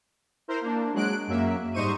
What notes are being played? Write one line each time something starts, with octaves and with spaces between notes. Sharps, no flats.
E4 A#4 C5
A#3 D4
F#3 G#3 F#6 D7
F#2 F#3 A#3 E5
G#2 G3 D#4 C5 C#6 D#7